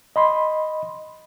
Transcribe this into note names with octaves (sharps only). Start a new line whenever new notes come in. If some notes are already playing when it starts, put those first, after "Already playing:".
D#5 B5 C6